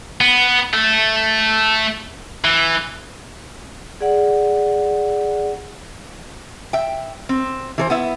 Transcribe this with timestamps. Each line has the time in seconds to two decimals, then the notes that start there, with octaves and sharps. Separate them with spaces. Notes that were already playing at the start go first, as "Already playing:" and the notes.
0.21 B3
0.73 A3
2.44 E3
4.01 G#4 D5 F#5
6.73 E5 G5
7.29 C4
7.78 E3 A4 C5
7.90 B3 E4 E5